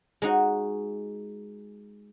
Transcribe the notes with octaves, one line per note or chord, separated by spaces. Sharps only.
G#3 D#4 F#4